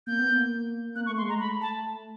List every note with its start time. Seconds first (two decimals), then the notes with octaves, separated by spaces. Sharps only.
0.07 A#3 G6
0.19 B3
0.32 A#3
0.96 A#3 F#6
1.06 C#6
1.09 A3
1.18 C6
1.22 G#3
1.29 A#5
1.35 A3 B5
1.61 A5